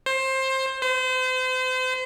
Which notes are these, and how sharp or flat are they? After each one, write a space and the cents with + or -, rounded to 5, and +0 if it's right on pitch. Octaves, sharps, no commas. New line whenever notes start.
C5 +20
C5 -35